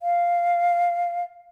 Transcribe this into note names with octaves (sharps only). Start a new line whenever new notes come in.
F5